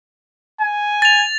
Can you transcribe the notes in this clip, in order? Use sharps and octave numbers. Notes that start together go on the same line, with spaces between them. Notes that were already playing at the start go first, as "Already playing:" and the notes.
G#5
A6 F7